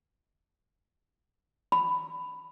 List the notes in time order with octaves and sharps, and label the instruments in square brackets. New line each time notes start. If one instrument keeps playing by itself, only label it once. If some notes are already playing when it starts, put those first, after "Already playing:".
[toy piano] B5